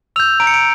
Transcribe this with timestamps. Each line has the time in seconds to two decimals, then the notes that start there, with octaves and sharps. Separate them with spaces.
0.16 E6 F7
0.20 G6
0.40 A#5 D7
0.47 C#7
0.54 D7